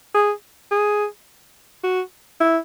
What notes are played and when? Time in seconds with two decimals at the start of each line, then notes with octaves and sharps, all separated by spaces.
0.14 G#4
0.71 G#4
1.83 F#4
2.40 E4